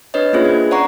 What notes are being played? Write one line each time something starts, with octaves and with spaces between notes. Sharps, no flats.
D4 B4 C#5 D#5
A#3 C#4 D4 F4 G#4 C5
G#6
C5 D5 F#5 A#5 C#6